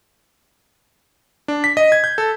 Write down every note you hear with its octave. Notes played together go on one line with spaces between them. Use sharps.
D4
B6
D#5
G#6
G6
A4